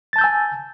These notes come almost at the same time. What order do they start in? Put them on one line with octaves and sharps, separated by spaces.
A6 A5 G6 E6 G#5